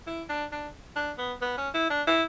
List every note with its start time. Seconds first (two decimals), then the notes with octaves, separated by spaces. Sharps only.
0.07 E4
0.29 D4
0.52 D4
0.96 D4
1.18 B3
1.41 B3
1.57 C#4
1.74 E4
1.90 D4
2.07 E4